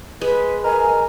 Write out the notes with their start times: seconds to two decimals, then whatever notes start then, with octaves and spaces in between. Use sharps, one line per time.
0.21 G#3 B4
0.64 A#4 B4 D#5 G#5